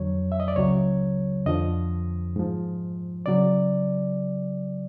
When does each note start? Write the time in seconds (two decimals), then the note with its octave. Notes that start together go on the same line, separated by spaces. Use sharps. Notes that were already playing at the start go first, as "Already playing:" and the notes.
Already playing: F2 D3 F#3 C#5
0.32 E5
0.40 D#5
0.48 D5
0.56 C#2 C#3 F#3 C#5
1.46 F2 D3 F3 D#5
2.36 G#2 F3
3.26 C#3 F#3 D5